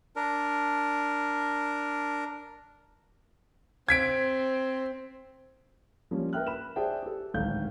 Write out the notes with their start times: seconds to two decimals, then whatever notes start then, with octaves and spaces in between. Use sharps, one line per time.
0.16 D4 A#4
3.89 C4 G#6 B6 D7
6.11 F3 G3 A#3 C#4
6.33 A#4 B4 E5 G5 F6 F#6
6.47 B5 E7
6.76 G#4 C5 D5 E5 G5 A5
7.03 G4 A4
7.34 D1 G#1 A3 F5 G6